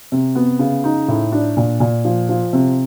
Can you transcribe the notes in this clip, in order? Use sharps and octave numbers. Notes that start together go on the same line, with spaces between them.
C3
B3
C#3
D#4
A2
D4
A#2
A#2
F3
F3
C3